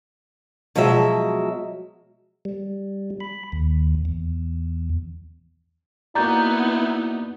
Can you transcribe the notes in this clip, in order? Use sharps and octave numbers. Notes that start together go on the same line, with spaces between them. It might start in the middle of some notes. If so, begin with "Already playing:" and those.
B2 F3 F#3 G#3 E5
G3
B5
D#2
E2
A#3 B3 D#4 E4 F#4 D5 A#5 G6